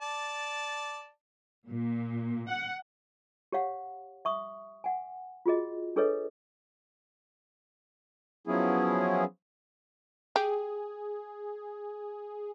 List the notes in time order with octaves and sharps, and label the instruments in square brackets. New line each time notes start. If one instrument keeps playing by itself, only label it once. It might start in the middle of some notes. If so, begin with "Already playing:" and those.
[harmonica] D5 A5
[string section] A#2
F#5
[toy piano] G4 C#5 F5 F#5
E5 C#6 D#6
F#5 G#5
F4 F#4 G#4 D#5
D4 G#4 A4 B4 C#5 D#5
[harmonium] F3 F#3 B3 C#4 E4 G#4
[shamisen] G4 [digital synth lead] G#4